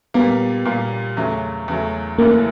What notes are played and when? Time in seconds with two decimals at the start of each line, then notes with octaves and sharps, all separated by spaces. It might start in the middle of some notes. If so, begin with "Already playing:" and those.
0.14 A#2 G3 A#3 B3
0.65 A#2 G3 A#3
1.17 E2 C#3 F#3 A3
1.68 E2 C#3 F#3 A3
2.19 F#1 F#2 C#3 E3 A3 A#3